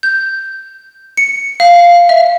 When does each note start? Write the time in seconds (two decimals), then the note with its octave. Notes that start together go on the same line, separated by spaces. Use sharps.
0.03 G6
1.17 C#7
1.60 F5
2.09 E5